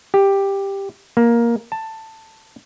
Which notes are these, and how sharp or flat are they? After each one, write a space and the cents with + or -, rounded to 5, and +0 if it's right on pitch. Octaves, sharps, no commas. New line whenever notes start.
G4 +5
A#3 +10
A5 +10